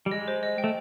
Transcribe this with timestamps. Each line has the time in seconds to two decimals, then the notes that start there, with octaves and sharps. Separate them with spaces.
0.06 G3
0.11 G#3 D#5
0.28 C5
0.43 D#5
0.58 G5
0.64 A3